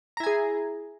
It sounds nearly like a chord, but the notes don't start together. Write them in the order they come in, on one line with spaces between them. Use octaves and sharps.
A#5 E4 G#5 G#4